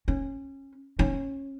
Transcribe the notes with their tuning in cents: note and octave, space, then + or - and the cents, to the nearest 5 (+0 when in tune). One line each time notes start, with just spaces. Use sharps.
C#4 -20
C#4 -20